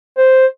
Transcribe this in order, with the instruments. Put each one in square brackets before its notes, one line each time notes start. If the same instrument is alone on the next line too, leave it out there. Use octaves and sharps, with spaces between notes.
[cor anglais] C5